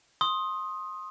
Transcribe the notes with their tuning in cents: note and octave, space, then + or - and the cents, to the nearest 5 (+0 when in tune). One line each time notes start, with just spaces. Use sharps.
C6 +20 D#6 +5